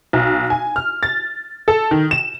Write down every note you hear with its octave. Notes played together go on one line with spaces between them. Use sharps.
B1
G#5
F6
A6
A4
D#3
E7